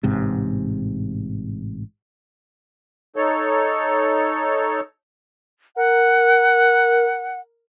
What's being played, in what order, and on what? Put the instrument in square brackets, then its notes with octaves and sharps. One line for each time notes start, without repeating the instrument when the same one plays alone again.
[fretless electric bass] A1 G#2 C3
[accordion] D#4 A4 C#5
[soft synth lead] A#4 [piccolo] F#5